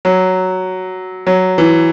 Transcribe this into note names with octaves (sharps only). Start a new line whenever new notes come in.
F#3
F#3
E3